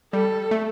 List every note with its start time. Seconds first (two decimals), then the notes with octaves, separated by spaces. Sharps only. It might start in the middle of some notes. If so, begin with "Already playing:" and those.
0.13 G3 A4
0.51 A3